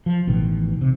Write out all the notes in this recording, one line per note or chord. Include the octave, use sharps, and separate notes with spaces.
F3
A1 B2 D#3
C3